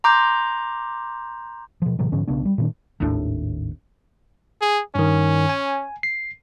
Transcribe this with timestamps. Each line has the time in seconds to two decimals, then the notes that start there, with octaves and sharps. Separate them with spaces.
0.04 A#5 C6 D6 G6
1.82 B2 F3
1.99 A2 C3 E3 F#3
2.12 G#2 D3 F3 C#4
2.28 B1 C#3 B3 D4
2.45 G3
2.58 A#2 D#3 D4
3.00 G#1 D#2 A2 D4
4.61 G#4
4.95 G2 D#3 C#4
5.49 G#5
6.03 C7